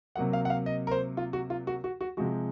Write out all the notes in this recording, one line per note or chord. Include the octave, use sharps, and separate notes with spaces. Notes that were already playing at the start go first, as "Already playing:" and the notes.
C3 F#3 A#3 F#5
F5
F#5
F5
D#5
A#4
C5
F4
F#4
F4
F#4
F#4
F#4
C3 F3 G#3 F#4